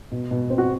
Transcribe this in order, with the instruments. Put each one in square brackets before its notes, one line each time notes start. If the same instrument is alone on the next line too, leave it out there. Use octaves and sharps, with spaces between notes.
[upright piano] B2
B2
C4
F#4